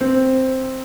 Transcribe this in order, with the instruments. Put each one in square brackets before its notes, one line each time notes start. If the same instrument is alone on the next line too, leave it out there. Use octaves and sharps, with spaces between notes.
[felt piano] C4